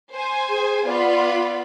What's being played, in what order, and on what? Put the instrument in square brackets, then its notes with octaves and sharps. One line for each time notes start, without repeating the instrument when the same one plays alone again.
[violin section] C5 G#5
[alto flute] G#4
[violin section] B3 F4 B5 [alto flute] D5